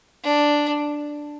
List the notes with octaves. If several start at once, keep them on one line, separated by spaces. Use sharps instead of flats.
D4